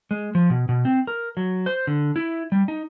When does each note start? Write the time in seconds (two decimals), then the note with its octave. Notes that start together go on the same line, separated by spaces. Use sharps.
0.11 G#3
0.35 F3
0.50 B2
0.69 B2
0.85 C4
1.07 A#4
1.37 F#3
1.66 C5
1.87 D3
2.16 E4
2.52 G3
2.68 D#4